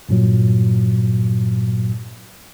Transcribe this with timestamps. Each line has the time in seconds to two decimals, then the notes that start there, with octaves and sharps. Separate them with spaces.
0.09 G2 A#2 F#3